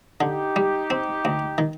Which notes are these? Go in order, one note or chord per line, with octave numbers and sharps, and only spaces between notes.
D3 D#4 G4
G3
C4
D2
D#3